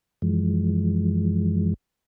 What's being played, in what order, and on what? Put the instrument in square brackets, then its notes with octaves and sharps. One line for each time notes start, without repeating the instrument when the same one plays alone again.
[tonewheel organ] F#2 E3 F3 G#3